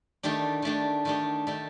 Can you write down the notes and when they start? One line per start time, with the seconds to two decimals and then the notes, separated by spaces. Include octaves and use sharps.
0.23 D#3 A3 D4 G4
0.62 D#3 A3 D4 G4
1.05 D#3 A3 D4 G4
1.47 D#3 A3 D4 G4